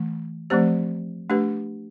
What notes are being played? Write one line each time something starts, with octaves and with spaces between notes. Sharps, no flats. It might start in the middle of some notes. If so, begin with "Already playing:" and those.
Already playing: E3 A3
F3 A3 C4 G4 C5
A3 D4 G4 B4